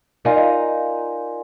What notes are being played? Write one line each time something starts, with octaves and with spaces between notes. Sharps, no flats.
D#4 F4 A#4 D5 F5 G#5 C6